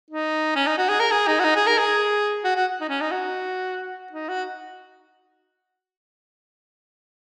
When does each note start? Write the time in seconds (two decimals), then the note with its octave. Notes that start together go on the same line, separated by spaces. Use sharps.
0.11 D#4
0.56 C#4
0.67 D#4
0.78 F#4
0.89 G#4
1.00 A#4
1.11 G#4
1.28 D#4
1.40 F#4
1.44 D#4
1.56 G#4
1.67 A#4
1.78 G#4
2.45 F#4
2.56 F#4
2.81 D#4
2.89 C#4
3.01 D#4
3.11 F#4
4.12 D#4
4.28 F#4